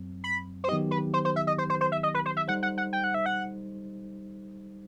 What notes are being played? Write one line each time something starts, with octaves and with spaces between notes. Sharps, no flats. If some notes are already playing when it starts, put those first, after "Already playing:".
Already playing: F#2 F#3 C4
B5
C5
D#3 F#3 B3 D#4 G4 D#5
B4
C5
C5
E5
D#5
C5
C5
C5
E5
D#5
B4
C5
E5
G3 D#4 A4 C5 F#5
F#5
F#5
G5
F#5
E5
F#5